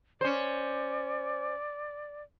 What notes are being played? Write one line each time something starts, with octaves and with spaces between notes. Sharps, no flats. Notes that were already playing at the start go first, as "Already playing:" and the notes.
C#4 C5 D5